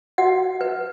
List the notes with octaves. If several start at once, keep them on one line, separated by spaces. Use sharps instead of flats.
F#4 F#5
B4